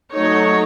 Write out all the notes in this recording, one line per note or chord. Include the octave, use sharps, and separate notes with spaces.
F#3 A3 D#4 C#5